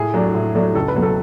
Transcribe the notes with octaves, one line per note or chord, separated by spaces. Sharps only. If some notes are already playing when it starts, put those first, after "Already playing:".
Already playing: A2 G#4
F#3 A3 D4
A2
F#3 A3 D4
C#2 A4
B4
B2 F#3 A3
A4